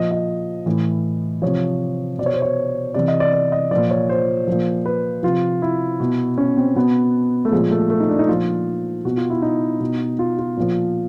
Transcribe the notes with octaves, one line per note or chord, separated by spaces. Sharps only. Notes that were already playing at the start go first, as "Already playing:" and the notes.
Already playing: A#2 F3 D#5
D#5
A2 E3
C3 F3 C#5
B2 D5
C#5
C5
C#5
C3 E3 D5
D#5
D5
D5
D#5
A#2 F3 D5
C#5
C5
A#2 F3
B4
C3 F3 F4
E4
B2
C#4
C4
B2 B3
A3
A#2 F3 G#3
A3
A3
D#4
D4
D#4
A#2 F3 F4
B2 F#4
F4
E4
D#4
B2
F4
F4
A#2 F3